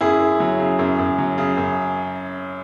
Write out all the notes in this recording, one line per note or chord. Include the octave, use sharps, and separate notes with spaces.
F#2 E4 G#4
F#2
F#3
C#3
F#2
F#2
F#3
C#3
F#2